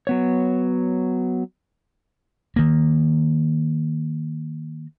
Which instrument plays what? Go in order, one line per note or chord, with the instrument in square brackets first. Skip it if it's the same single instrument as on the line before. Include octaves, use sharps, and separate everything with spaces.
[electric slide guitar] F#3 B3 C#5
[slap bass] D#3 A#3